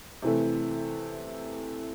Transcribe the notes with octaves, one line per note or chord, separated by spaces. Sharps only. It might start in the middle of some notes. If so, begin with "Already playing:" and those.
C3 E3 A3